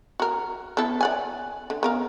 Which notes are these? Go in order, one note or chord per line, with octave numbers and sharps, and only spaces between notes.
F#4 A#4
B3 E4 A4
D5 F#5 G#5
D3
B3 A#4 F5